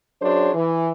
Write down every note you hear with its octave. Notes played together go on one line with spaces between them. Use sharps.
F#2 F#3 D4 G#4 C5 C#5
E3